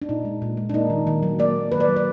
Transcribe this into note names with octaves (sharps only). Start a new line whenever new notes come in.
D4
A#2 D#4
G#3
A#2
G#3
D4
A#3 D#4
D#3
D#3
F#3
A#3 D5
D#3
D#3 B4
D5
F#3
D5